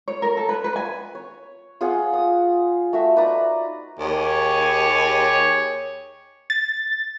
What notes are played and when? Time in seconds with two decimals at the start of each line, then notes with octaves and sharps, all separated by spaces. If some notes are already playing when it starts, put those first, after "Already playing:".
0.08 C#5
0.22 A#4
0.37 A4
0.49 B4
0.64 B4
0.76 G#5
1.15 C#5
1.81 F4 G#4 C#5 F#5
2.14 D#6
2.93 A3 F#4 E5
3.16 D#4 B4 D5 A#5
3.99 D#2 G4 G#4 C#5
6.50 A6